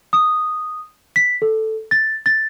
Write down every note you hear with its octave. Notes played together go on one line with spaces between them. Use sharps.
D#6
B6
A4
A6
A6